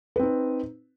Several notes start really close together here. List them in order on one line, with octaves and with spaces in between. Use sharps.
B4 C4 D#4